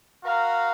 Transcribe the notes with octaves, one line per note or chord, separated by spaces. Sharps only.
F#4 A#4 F5